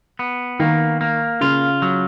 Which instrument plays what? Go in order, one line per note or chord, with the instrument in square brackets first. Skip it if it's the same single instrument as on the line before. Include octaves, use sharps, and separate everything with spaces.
[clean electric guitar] B3
[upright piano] D#3 [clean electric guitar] A#3
[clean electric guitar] A#3
[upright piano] C#3 [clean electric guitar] F4
[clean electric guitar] F#3